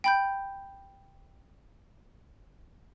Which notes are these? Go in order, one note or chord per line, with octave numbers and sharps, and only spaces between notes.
G5 B5 G6